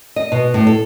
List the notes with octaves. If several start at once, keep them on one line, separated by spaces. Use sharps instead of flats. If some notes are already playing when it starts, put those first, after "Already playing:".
D#5
B2
A2
A4